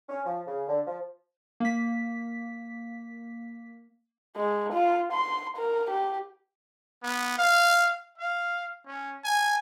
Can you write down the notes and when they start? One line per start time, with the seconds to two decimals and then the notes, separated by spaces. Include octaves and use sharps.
0.09 C#4
0.25 F3
0.47 C#3
0.68 D3
0.87 F3
1.60 A#3 B6
4.36 G#3
4.73 F4
5.12 C6
5.57 A#4
5.90 G4
7.03 B3
7.38 F5
8.18 F5
8.87 C#4
9.24 G#5